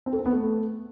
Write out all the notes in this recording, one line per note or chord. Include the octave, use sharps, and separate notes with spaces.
C4
A4
C4
B3
A3